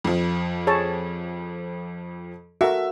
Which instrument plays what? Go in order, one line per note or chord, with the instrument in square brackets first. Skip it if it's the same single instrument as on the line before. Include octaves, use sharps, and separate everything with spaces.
[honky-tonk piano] F2 F3
[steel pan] G#4 C#5 A5
[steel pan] F#4 A4 A#4 [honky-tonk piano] E5